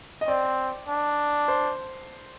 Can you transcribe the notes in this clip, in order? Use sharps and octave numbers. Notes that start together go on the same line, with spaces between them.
D#5
C4 D5
D4
C5